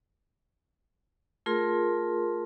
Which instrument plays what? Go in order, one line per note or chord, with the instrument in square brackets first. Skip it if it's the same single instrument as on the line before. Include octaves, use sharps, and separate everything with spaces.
[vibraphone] A3 F4 G#4 A#4 C6